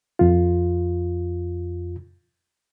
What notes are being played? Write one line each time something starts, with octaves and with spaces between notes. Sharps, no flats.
F2 F4